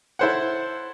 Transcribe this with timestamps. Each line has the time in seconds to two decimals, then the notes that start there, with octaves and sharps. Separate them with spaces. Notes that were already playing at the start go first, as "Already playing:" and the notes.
0.19 E4 A4 C5 C#5 F#5